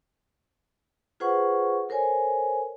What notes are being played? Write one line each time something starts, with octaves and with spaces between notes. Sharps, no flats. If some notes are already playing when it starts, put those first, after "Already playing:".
F4 G#4 B4 C5 F#5 C#6
A4 A#4 C5 C#5 G#5